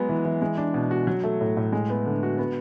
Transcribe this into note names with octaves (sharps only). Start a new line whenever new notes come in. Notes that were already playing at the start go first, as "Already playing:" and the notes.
Already playing: F#3 G#3 B3
E3
E3
G#3
D4
B2
F#4
F#3
A3
A2
A2
G#3
B3
D3
F#4
B3